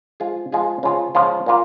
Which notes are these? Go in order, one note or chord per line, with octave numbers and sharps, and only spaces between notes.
F3 G#3 F4 G#4
F3 G#3 F4 G#4
C#3 F3 G#3 F4
C#3 F3 G#3 F4
A#2 A#3 F4